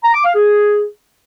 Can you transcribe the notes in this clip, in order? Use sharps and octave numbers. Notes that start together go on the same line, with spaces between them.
A#5
D6
F5
G#4